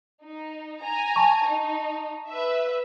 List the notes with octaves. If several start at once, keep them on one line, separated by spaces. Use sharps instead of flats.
D#4
G#5 A#5
A5 C#6
D#4
B4 E5